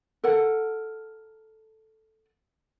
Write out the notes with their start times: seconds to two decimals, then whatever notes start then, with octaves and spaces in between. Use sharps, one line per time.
0.24 A4 A#4 F#5